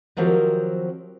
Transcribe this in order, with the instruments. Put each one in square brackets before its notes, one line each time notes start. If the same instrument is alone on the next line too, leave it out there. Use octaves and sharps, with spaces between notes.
[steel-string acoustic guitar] D#3 F3 F#3 C4 G4 A#4